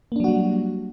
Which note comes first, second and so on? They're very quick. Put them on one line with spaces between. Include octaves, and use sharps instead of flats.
A#3 D4 F#3 F#4 G3